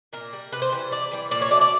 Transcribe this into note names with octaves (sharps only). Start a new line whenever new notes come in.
A#2 A#4
G3
C3 B4
C5
E3 G3
C3 D5
E3 G3
A#2 D5
C#5
F#3 A3 D5
D5